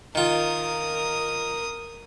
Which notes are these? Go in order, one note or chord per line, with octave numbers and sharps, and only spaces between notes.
D#3 F4 A#4 D#6